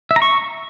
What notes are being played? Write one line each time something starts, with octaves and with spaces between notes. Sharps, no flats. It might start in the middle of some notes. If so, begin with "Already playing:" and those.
E5
A#5
C#6